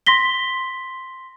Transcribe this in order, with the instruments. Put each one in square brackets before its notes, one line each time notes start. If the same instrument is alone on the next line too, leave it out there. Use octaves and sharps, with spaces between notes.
[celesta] C6 A#6 B6 G7